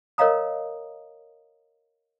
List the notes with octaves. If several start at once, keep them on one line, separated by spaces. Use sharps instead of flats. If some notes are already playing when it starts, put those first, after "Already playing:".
A#4 C#5 D#5 F5 A#5 D#6